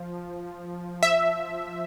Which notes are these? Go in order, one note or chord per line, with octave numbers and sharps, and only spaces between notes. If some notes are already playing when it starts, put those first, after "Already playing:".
Already playing: F3
E5